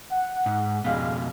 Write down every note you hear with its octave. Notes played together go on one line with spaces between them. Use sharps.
F#5
G#2
F2 B2 G3 G#3 F5